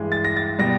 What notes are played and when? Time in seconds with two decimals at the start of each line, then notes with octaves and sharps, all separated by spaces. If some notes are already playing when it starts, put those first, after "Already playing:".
Already playing: G2 E3 G#3
0.12 A6
0.24 A#6
0.37 A6
0.59 B2 G3 A#6